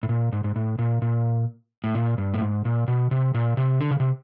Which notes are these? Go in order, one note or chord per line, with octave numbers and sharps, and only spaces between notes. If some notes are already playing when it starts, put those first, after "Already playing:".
A2
A#2
G#2
G#2
A2
A#2
A#2
A2
A#2
G2
A2
G#2
A#2
B2
C3
A#2
C3
D3
C#3
C3